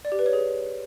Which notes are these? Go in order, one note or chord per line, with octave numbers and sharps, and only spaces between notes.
D5
G4
B4
C#5
G#4